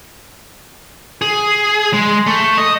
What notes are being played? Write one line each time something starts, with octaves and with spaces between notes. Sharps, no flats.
G#4
G#3
A3
D#5